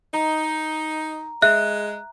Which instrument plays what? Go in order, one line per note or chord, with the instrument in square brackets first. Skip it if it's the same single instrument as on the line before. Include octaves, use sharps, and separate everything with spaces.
[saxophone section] D#4 [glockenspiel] A#5
[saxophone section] G#3 [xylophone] E5 [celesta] F#6